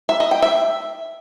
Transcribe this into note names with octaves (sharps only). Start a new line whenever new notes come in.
E5
D#5
G5
E5